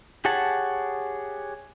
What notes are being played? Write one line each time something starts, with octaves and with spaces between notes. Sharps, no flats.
G4 G#4 C#5 F#5 A5